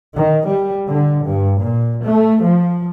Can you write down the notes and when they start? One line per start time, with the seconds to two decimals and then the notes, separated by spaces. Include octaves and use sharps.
0.14 D#3
0.45 G3
0.89 D3
1.28 G2
1.61 A#2
2.05 A3
2.45 F3